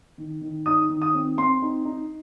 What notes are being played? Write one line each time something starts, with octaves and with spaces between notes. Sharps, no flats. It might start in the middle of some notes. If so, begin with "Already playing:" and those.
D#3
D#3
D#4 D#6
D#3
D#6
C4
C4 C6
D#4
D#4